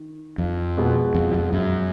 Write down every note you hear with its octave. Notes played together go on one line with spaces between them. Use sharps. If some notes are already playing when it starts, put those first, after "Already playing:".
Already playing: D#3
F2
B2 G#3 B3
F2
F2
F#2